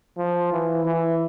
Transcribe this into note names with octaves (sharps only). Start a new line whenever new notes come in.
F3
E3
E3